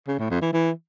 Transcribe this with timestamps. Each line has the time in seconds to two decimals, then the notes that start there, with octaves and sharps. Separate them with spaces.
0.08 C#3
0.19 A2
0.30 F2
0.42 E3
0.53 E3